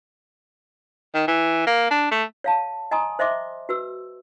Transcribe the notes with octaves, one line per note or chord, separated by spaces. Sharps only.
D#3
E3
A#3
D4
A3
C#5 F5 A5
D#5 G#5 A#5 C6 D#6
C5 D#5 E5 C6 D6
F#4 B4 E6